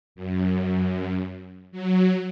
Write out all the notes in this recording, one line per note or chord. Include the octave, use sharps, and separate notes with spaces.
F#2
F#3